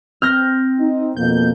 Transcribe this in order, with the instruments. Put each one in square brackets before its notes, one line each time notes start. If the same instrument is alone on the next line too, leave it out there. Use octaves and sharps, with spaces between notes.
[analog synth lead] C4 [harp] F6 G6 A#6
[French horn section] D#4
[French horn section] F2 B2 A#3 [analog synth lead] G6